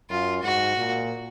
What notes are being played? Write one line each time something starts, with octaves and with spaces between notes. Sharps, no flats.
F#2 F4
G#2 F#4
A#2